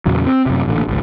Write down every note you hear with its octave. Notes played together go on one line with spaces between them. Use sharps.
E2 A#2 C#3 F#3
C4
F#2 C3
A1 A#2 D3
G#1 C#2